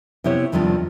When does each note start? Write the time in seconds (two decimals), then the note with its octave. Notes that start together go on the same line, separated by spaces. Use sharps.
0.24 C3 B3 E4 G4 C#5
0.52 E2 C3 D#3 F3 G3 D4